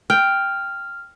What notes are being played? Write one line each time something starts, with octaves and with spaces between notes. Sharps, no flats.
G5 F6